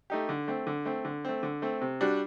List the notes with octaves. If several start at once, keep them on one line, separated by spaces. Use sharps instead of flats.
A3 D#4 G4
D3
A3 C4
D3
A3 C4
D3
A3 C4
D3
A3 C4
C3
G3 D4 F#4